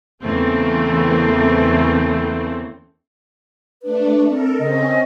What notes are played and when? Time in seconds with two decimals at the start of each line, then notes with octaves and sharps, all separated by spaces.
0.24 E2 C#3 E3 A3 A#3 C4
3.83 A3 D4 B4
4.29 C4 A4 A#4
4.59 C#3 C4 C#4 D#5